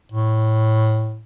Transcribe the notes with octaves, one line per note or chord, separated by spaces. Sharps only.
A2